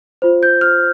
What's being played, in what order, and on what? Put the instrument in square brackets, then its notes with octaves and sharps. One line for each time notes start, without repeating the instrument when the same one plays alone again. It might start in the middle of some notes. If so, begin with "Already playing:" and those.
[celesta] F4 C5
G6
F6